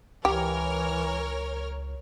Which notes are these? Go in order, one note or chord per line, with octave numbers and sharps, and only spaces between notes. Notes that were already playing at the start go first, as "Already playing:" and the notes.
C#2 E3 G4 A#4 C#5 F6